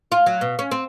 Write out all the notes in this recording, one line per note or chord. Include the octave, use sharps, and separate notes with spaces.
F4
F#3
B2
C#4
C4